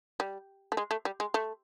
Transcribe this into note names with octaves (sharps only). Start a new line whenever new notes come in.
G3
A3
G#3
A3
G3
G#3
A3